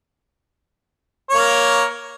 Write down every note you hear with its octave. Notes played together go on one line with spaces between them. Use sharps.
A#3 A#4 C#5